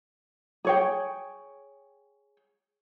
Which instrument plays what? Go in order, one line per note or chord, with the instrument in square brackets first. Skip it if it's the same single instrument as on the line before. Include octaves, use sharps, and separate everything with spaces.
[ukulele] G#4 C#5 G5